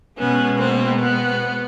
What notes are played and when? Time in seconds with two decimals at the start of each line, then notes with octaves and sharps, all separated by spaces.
0.18 B2 G#3 B3 C#4
0.59 A#3 C4
0.99 B3